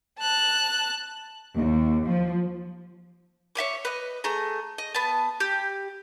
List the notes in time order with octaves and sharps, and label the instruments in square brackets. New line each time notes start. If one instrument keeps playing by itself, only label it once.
[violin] A5 F#6
[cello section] D#2
F3
[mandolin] C#5 E5 G#5 D6
B4 D#5
A3 G#4 A#5
D#5
B3 A5
G4